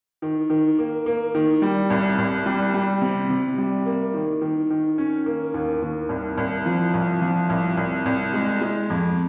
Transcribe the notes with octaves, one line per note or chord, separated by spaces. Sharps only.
D#3
D#3
A#3
A#3
D#3
G3
C2
C2
G3
G3
C3
C3
G3
A#3
D#3
D#3
D#3
C#4
A#3
D#2
D#2
C2
C2
F3
C2
F3
C2
C2
C2
G#3
G#3
F2